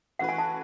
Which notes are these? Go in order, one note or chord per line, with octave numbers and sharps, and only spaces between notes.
E3 A3 C#4 F#4 B4 F#5
G#5
A5